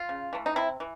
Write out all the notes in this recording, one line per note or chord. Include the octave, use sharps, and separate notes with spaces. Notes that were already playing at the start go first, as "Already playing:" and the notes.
Already playing: F4
C#3
E3 A3
D#4
C3 E4
E3